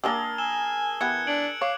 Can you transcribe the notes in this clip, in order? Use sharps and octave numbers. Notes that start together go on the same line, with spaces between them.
A#3 D4 G4 G#4 A#4 A5 E6 G7
G#5 E6 E7 G7
E3 B3 G4 F#6 G#6 C#7
D4 G#6 D7 F#7
C#5 F5 D6